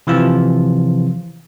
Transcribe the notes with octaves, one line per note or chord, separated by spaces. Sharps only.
C3 E3 F3 F4